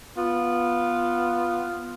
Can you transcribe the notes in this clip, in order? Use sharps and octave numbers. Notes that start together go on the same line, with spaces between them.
B3 F4